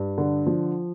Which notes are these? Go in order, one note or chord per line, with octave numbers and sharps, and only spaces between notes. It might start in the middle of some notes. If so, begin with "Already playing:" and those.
Already playing: G2
D3
F3